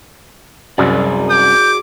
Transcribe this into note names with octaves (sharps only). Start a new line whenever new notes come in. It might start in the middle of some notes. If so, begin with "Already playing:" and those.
C2 F#2 F#4 G#4 D5
D6 G6